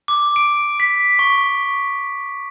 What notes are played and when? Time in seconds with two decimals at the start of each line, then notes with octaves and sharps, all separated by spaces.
0.08 D6
0.36 D7
0.80 B6
1.19 C#6